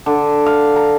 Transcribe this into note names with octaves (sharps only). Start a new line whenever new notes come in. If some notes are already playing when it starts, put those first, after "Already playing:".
D3
F5
A#5